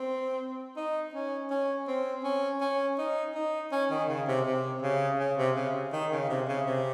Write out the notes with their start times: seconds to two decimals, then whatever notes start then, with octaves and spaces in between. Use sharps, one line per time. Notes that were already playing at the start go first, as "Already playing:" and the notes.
Already playing: C4
0.77 D#4
1.14 C#4
1.50 C#4
1.88 C4
2.24 C#4
2.61 C#4
2.98 D#4
3.35 D#4
3.72 C#4
3.90 D#3
4.09 C#3
4.28 C3
4.46 C3
4.82 C#3
5.19 C#3
5.37 C3
5.56 C#3
5.93 D#3
6.11 C#3
6.29 C3
6.48 C#3
6.66 C3